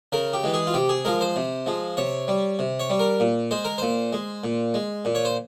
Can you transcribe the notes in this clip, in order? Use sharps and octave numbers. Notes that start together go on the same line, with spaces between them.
C#3 A#4
G4
E3 G#3
G#4
F4
C3 G4
G#4
F3 G#3 A#4
C5
C3
F3 G#3
C3 C#5
G3
C3
C#5
G3
A#4
A#2
G#3 C5
A#4
A#2 C5
G#3
A#2
G#3
A#2
C#5
C5